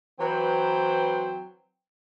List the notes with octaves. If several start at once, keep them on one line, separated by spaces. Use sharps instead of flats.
E3 F#3 C4 B4 C5 G5